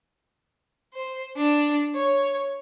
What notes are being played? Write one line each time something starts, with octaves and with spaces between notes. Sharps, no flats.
C5
D4
C#5